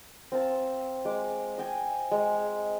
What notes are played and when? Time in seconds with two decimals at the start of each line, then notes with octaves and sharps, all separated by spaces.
0.32 C4 F5 A5
1.05 G#3 D6
1.58 D#5 G5 G#5
2.11 G#3